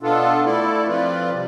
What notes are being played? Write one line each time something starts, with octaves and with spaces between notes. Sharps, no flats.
B2 B3 D4 F4 A4
A3 E4 A4 D5
F3 C4 F4 B4 D5
C3 G3